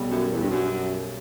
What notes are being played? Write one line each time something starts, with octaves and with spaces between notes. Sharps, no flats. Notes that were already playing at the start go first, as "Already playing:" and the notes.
Already playing: B1 B2 G3
F#2
E2
G2
F#2